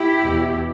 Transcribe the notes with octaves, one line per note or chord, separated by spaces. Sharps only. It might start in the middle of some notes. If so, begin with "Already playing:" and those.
Already playing: E4 G4
E2 B2